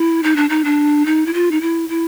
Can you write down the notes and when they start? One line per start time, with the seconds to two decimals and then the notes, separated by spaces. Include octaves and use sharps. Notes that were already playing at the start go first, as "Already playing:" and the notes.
Already playing: E4
0.23 D#4
0.36 D4
0.49 D#4
0.64 D4
1.06 D#4
1.26 E4
1.34 F4
1.51 D#4
1.61 E4
1.89 E4